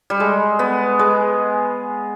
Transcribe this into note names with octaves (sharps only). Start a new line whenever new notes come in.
G3
G#3
B3
G#3